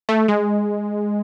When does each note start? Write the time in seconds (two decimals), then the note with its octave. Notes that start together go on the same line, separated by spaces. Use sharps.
0.09 A3
0.28 G#3